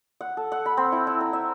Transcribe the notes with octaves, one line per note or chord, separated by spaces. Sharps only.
F#5
A4
F#5
B5
C4
E4
E4
A#5
E5